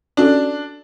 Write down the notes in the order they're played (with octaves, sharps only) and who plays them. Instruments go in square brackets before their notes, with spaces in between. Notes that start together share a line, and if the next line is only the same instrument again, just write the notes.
[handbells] C#4 F#4 A4 D5 [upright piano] D4